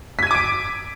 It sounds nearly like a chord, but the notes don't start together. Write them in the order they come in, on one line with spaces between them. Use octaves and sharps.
B6 G#6 D#7 D6 D7